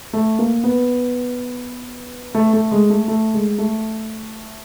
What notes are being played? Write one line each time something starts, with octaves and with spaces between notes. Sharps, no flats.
A3
A#3
B3
A3
A3
G#3
A3
A3
G#3
A3